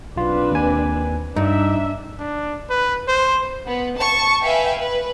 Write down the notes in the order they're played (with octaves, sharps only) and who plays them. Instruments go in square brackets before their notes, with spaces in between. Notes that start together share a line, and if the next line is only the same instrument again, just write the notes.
[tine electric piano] B1 F4 [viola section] C4 D4 B4
[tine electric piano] D#2 G#5
[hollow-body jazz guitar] G2 [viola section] D4 E5 [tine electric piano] D#4
[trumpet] D4
B4
C5
[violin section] B3
A5 C#6
B4 E5 F5 G5 G#5
B4